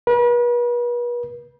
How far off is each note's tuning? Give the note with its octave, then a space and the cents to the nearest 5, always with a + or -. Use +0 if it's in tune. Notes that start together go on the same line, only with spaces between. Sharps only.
B4 -40